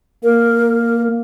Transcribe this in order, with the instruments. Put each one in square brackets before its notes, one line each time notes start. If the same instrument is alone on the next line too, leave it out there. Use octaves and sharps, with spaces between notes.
[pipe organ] A#3 [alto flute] A#4